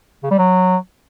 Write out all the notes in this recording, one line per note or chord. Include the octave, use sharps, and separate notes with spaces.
C#3
G3
F#3